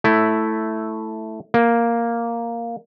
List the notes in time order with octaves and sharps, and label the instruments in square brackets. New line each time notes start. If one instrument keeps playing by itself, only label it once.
[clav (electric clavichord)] A3 E4
A#3